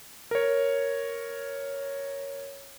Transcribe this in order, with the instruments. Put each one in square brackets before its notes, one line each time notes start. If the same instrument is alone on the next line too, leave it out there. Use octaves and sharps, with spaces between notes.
[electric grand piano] A#4 C#5